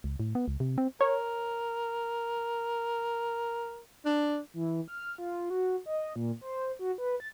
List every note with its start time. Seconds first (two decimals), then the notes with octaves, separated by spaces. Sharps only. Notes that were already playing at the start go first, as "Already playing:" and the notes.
0.04 C#2
0.20 A2
0.35 B3
0.48 C#2
0.60 C3
0.78 C4
1.01 A#4 C#5
4.06 D4
4.54 E3
4.88 F6
5.18 F4
5.50 F#4
5.86 D#5
6.16 A#2
6.41 C5
6.79 F#4
6.98 B4
7.20 A6